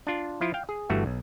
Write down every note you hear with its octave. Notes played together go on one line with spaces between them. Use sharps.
D4 F4
F3 E4 F4
F5 G5
G#4
G1 G2 E3 A3 F#4
B1